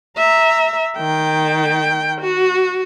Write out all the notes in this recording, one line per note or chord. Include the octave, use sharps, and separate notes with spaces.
E5 A#5
D#3 G5
F#4